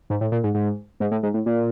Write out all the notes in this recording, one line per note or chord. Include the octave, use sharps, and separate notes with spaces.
G#2
A2
A#2
G#2
G#2
G#2
A2
G#2
A2
A#2